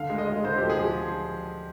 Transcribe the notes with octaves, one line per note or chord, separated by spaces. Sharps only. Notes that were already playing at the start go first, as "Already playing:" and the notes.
Already playing: D3 F5
G#3
D#5
G#3
D3 C5
F3 G4
G#4
F3